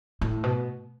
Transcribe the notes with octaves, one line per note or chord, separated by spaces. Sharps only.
A2
B2